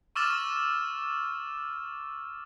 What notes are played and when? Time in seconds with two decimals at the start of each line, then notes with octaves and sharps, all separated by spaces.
0.16 C#6 D6 E6 F6 A6 E7